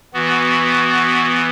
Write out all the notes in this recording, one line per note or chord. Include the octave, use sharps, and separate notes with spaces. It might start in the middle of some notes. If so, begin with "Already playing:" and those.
E3 B3 F#4